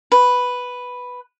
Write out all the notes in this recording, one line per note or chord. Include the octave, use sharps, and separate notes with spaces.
B4